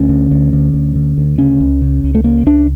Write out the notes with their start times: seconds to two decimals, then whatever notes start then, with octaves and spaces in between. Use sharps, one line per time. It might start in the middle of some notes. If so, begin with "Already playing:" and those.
Already playing: D2 C#4
0.09 D3
0.31 D2
0.53 D3
0.74 D2
0.96 D3
1.18 D2
1.38 C#3 C#4
1.61 C#2
1.82 C#3
2.04 C#2
2.15 A3
2.24 C#3 A#3
2.46 C#2 D4